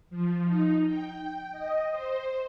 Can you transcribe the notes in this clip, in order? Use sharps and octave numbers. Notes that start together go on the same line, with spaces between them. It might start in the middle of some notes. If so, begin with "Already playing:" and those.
F3
D#4
G5
D#5
C5